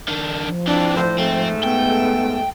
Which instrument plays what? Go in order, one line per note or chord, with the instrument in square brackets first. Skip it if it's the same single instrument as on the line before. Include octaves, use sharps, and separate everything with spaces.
[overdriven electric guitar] D#3 D4
[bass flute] F3
[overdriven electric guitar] E3 C4 [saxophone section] D4
[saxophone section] A2 D4 C5
[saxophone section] G#2 G#3 A3 [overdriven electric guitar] C4
[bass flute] B3 [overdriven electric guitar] G5